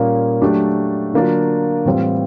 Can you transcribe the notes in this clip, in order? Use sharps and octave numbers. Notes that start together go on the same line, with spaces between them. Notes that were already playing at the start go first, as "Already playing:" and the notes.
Already playing: A#2 G3 A#3 C#4
F#3 A3 D4 G4
D3 F#3 A#3 D4 F4
A2 E3 G3 C4 F4